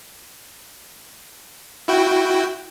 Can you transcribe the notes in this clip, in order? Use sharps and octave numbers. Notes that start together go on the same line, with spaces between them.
E4 F#4 G5